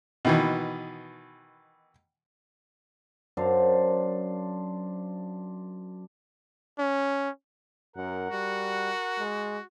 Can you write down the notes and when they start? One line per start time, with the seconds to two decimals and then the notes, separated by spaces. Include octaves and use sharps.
0.25 B2 D#3 E3
3.37 F#2 D4 C5 F5
6.79 C#4
7.96 F#2 A#4 F#5
8.31 G3 F#4
9.19 G#3